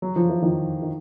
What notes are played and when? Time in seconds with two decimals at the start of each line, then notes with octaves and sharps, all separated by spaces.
0.02 F#3
0.16 F3
0.29 E3
0.42 D#3 F3
0.82 D#3